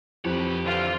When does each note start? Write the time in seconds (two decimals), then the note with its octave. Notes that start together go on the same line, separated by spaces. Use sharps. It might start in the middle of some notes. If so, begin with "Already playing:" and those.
0.25 F2 G4 B4 C#5
0.65 D3 E3 F4